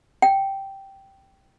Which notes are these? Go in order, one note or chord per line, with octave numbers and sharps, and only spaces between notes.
G5